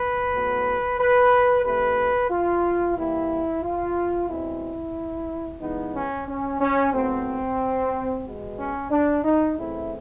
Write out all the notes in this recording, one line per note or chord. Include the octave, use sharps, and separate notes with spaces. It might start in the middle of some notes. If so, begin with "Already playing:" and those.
Already playing: B4
A2 F#3 B3
B4
C3 E3 A3 B4
F4
E3 G3 A#3 E4
F4
B2 G#3 C4 E4
E3 G#3 B3 D#4
C#4
C#4
C#4
A2 F#3 B3 C4
B2 G#3 B3
C#4
D4
D#4
C#3 E3 A3 C4 E4